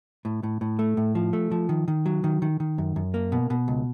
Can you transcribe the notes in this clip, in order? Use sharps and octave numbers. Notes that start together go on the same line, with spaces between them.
A2
A2
A2
A3
A2
F3
A3
F3
D#3
D#3
F#3
D#3
D#3
D#3
F#2
F#2
A#3
B2
B2
C#2